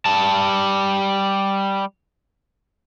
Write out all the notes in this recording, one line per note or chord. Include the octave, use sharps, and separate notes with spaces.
G3 A5